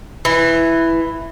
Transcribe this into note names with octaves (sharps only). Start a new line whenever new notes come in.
E3